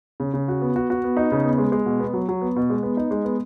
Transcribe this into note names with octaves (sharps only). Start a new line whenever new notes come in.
C#3
C#3
F#4
B3
F#4
F#4
B3
D#4
C#3
B3
G#3
G#3
B2
B3
F#3
F#3
B3
B2
G#3
B3
D#4
G#3
B3